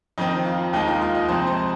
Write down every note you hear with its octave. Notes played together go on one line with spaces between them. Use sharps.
F2 D#3 C4 D#4
F4
D#2 D#3 G#3 D#4
F4
F4
D#5
F2 C3 G#3 C4 C5
C5